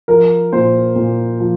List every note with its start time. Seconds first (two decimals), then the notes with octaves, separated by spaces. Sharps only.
0.08 F3 A#4
0.52 A#2 C5
0.96 A#2
1.40 F3